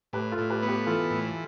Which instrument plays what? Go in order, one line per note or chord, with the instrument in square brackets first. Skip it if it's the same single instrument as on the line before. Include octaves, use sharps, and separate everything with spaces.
[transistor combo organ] A2 [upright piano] G4 B4
[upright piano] F4 A4
[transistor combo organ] A2
[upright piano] G4 B4
[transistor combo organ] B3
[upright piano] G4 B4
[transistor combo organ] E3 [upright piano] F4 A4
[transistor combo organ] A2